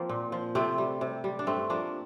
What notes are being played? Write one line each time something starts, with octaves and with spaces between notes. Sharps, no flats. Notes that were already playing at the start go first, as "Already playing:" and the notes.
Already playing: F3 A#3 C4
A#2
F3
C3 A3 C4
G3
C3
G3
D4
G2 A3 C4
F3 A#3 D4